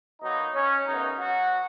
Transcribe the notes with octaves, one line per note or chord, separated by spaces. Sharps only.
B2 F#3 A#3 D#4
C#4
F#2 C#3 F#3 B3 D#4
F#3 F#4